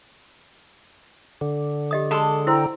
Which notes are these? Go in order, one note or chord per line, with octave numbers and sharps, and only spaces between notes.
D3
G4 D#5 D#6
G#3 A4 B5 C6
E4 C5 G5 A#5 C6 E6